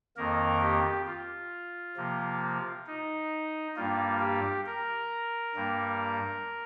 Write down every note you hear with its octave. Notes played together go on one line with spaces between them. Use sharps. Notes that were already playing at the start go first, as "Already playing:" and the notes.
F2 D#3 A#3 A#4
G4
F4
C3 F3 A#3
D#4
G2 G3 A#3 F4
G4
A#4
G2 G3 A#3